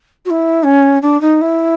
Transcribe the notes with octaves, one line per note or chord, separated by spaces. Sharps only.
F#4
E4
C#4
D4
D#4
E4